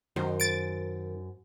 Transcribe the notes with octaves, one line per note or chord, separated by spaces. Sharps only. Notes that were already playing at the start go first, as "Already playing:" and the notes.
F#2 D#3 C5
A6 D7